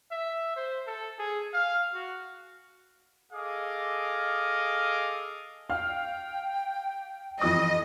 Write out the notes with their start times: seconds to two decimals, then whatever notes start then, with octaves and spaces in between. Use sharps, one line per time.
0.11 E5
0.56 C5
0.87 A4
1.19 G#4
1.53 F5
1.94 F#4
3.32 G#4 A4 D#5 F5 D6 D#6
5.70 F5 G5 F6
7.41 F2 E3 D#5 D#6